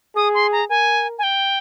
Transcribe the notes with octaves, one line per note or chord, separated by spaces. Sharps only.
G#4 D#6
C6
A#5
A#4 G#5
G#5
G5